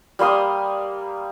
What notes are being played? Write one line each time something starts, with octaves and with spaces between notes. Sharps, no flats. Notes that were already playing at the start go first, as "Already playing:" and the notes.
G3 A#3 C6 D#6